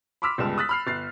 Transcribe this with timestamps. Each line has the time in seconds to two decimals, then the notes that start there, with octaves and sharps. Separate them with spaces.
0.22 B5 C6 D6 E6 F6 B6
0.38 G1 C#2 G3 G#3 A5 E7
0.58 D#6 F#6 A6 B6
0.69 B5 F6 C7
0.87 G1 A6 C7